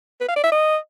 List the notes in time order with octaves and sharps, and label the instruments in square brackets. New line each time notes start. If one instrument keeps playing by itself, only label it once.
[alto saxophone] B4
F5
D5
E5
D#5